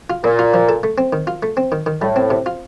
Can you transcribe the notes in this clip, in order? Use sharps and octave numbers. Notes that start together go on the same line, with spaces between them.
F4
A#2 A#3
F4
F3
A4
A3
C4
D#3
F4
A3
C4
D#3
D#3
A2 G3
C4
C3
F4